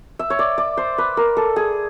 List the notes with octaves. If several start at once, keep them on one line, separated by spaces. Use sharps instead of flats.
E5
C#5
D5
D5
C5
B4
A#4
A4
G#4